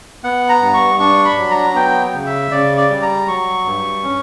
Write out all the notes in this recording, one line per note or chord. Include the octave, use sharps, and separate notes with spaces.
B3 F#5
A#5
G2
C#6
D4 C#6
B5
F#3
A#5
B3 G5
C#3
E5
C#3 D5
D5
G3
A#5
F#3 C#6
G2
C#4